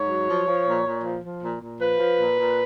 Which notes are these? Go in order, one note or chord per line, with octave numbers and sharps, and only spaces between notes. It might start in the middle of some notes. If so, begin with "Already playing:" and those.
Already playing: G#2 C#5
F#3
F3
F3
A#2
A#2
F3
F3
A#2
A#2
F3 B4
F3
A#2
A#2